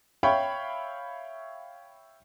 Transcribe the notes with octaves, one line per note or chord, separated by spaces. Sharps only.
C#5 E5 F5 G5 B5 C#6